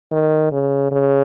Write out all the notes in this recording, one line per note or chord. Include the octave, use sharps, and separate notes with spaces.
D#3
C#3
C#3